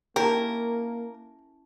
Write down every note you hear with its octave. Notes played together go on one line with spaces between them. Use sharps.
A#3 C#4 E4 G4 A#4 A5